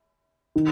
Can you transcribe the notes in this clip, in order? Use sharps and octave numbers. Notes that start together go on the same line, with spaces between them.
D#3